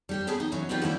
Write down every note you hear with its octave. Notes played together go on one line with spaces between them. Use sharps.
G3 G4 C5
F#3 A3 B3 G4 G#4 B4
D#4
E3 F#3 C#4
G3 B3 C4 D#4 F4 G4
F3 G3 A#3 B3 C#4 E4